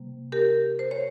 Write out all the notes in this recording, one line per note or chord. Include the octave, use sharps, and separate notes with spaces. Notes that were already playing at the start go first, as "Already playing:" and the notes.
Already playing: C3 G3 A#3
G4 A#4
C5
C#5